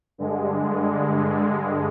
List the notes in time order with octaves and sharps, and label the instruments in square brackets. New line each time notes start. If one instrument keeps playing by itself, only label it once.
[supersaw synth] G2 D3 G#3